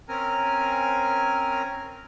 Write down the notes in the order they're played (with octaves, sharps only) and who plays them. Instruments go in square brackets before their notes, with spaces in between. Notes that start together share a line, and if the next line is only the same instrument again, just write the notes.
[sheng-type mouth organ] C4 C#4 A#4 G#5 A#5 F6